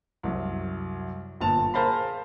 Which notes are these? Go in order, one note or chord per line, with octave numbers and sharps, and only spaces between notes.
C2 F#2
G1 A#2 A5 F7
G#4 A#4 C5 F5 A5 B5